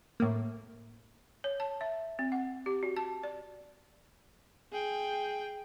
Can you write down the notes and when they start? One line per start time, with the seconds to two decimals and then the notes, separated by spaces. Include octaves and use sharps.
0.20 A2 A#3
1.44 C#5
1.60 A5
1.81 E5
2.19 C4
2.32 F#5
2.66 G4
2.83 F#4
2.96 A5
3.23 D5
4.72 G#4 G5